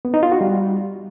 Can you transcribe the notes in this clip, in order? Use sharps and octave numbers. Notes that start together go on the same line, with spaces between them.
B3
D#4
F4
F#4
G3